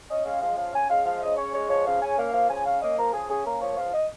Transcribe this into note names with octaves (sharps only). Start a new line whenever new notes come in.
C#4 D#5
G#3 F5
F3 F5
C#3 F5
C#4 G#5
G#3 F5
F3 F5
C#3 D#5
C#4 C#5
G#3 C#5
F3 C#5
C#3 F5
C#4 G#5
A#3 F5
F3 F5
C#3 G#5
C#4 F5
A#3 D#5
F3 A#4
C#3 G#4
C#4 G#4
A#3 A#4
F3 C#5
C#2 F5
D#5